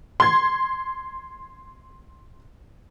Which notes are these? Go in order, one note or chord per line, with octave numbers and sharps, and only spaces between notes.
C6 G#6